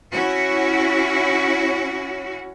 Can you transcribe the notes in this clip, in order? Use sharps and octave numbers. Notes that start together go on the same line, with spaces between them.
C#4 E4 F#4